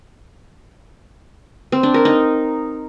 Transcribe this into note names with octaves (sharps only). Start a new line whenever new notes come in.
C4
D4
A#4
D#4